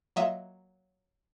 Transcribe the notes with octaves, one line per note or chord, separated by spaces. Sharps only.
F#3 A#3 F4 D#5 E5